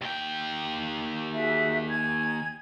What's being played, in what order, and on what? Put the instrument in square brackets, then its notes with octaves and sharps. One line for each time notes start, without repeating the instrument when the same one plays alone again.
[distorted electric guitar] D#2 G5
[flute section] F#4 G#4 E5
G#5 G#6